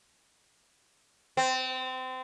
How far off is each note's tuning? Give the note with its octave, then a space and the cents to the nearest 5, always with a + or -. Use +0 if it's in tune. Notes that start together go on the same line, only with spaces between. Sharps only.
C4 -25